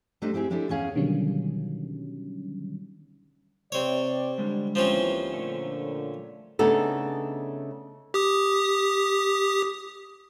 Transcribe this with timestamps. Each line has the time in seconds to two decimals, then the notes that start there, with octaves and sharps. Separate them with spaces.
0.22 G3 A3 D4 D#4 G4 C5
0.34 C4 E4 G4 G#4
0.50 G#3 D4 E4 G4 A4
0.69 E2 C#4 G#4 F5
0.95 B2 D3 D#3 F#3 G3 C#4
3.72 C3 C4 C#5 D5
4.38 D3 G3 G#3
4.75 D#2 E3 F3 C4 C#4
5.31 A#2 D3 A3 C#5
6.59 C#3 A3 B3 D4 D#4 A4
8.14 G4 D#6